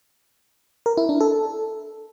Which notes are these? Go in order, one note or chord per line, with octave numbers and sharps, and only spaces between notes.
A#4
E4
D4
A4